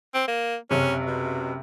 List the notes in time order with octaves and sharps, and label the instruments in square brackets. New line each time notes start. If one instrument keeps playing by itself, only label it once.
[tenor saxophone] C4
A#3
[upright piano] F#1 C3 [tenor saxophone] C#4
[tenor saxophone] B2